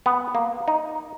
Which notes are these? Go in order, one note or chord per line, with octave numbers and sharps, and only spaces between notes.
B3
A#3
D#4